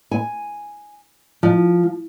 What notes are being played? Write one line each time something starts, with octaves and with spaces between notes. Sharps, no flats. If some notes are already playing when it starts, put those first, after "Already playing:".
G#5
F3